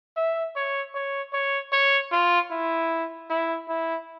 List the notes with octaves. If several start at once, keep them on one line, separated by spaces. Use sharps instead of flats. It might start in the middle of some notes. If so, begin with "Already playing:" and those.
E5
C#5
C#5
C#5
C#5
F4
E4
E4
E4